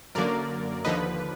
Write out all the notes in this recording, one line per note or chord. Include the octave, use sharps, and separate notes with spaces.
F#2 D3 F#3 A#3 A#4 D5
D#2 D3 F3 B4 D#5